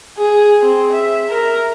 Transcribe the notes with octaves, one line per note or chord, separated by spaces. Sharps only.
G#4
C4
E5
A#4